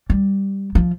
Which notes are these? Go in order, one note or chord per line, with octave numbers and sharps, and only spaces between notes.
G3
F3